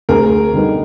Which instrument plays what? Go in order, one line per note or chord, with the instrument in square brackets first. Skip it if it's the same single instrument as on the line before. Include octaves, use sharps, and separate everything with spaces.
[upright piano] D2 [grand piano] G#4 A#4
[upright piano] D3 G3 B3 D#4